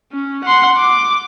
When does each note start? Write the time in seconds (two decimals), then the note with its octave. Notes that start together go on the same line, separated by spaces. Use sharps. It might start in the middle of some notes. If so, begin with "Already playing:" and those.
0.12 C#4
0.44 F#5 C6
0.78 D6